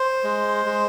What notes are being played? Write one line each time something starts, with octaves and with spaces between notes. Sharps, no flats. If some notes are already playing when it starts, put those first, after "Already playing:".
Already playing: C5
G#3
G#3